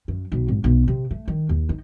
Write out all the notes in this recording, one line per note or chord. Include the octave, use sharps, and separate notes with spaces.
F#2
B1
G#1
B1
C3
A3
D#3
D#2
D#4